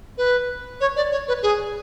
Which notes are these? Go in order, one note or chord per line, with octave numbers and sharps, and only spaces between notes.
B4
C#5
D5
C#5
B4
G#4